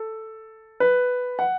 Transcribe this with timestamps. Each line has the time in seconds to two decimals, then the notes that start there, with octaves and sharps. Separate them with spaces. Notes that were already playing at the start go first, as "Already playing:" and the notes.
Already playing: A4
0.80 B4
1.39 F#5